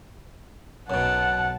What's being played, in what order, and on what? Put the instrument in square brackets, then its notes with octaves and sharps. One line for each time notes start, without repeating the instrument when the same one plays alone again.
[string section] B1 A5 [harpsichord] F#2 B2 [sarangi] F#5